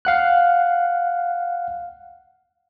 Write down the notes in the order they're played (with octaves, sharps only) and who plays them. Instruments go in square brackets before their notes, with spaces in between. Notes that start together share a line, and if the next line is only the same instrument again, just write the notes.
[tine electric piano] F5 F#5 F#6